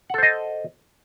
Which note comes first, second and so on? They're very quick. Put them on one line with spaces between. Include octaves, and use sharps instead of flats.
F#5 A4 C5 D#5